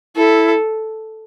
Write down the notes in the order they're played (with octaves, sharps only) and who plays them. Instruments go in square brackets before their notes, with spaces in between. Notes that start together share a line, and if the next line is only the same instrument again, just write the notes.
[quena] E4 [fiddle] A4